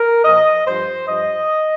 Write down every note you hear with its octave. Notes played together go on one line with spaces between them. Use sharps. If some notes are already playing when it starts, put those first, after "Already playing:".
Already playing: A#4
A#2 F3 D#5
G2 F3 C5
G2 F3 D#5